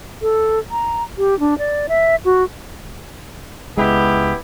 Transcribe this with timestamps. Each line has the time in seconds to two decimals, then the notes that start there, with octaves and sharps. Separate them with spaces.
0.22 A4
0.71 A#5
1.18 G4
1.40 D4
1.58 D5
1.89 E5
2.25 F#4
3.77 C#2 G#3 B3 E4 G4